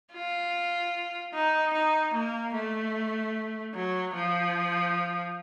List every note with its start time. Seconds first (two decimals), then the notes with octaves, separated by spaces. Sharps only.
0.13 F4
1.34 D#4
1.73 D#4
2.14 A#3
2.54 A3
3.74 F#3
4.15 F3